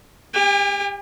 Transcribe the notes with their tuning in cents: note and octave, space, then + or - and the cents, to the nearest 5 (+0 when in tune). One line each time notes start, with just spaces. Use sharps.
G4 +25 G#5 -40